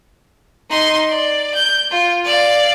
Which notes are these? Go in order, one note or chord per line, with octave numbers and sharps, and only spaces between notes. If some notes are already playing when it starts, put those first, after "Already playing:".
D#4 C6
D5
G6
F4
D5 F5